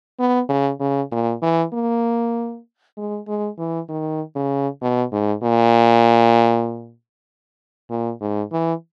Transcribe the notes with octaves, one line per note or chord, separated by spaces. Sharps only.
B3
C#3
C#3
A#2
E3
A#3
G#3
G#3
E3
D#3
C#3
B2
G#2
A#2
A#2
G#2
E3